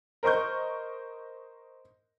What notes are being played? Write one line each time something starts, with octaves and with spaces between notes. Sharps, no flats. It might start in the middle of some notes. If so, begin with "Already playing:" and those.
A#4 C5 D#5 C#6 G6